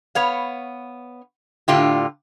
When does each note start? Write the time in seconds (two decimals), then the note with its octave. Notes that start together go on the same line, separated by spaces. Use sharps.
0.15 B3 C#5 F5
1.68 A2 D3 F4 G4